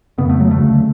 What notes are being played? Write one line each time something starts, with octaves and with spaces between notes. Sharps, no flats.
F2 C#3 B3
A3
F#3
D2 C#3 A3